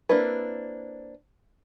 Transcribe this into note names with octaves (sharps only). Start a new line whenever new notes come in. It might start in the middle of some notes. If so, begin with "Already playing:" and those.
A#3 C4 D4 E4 B4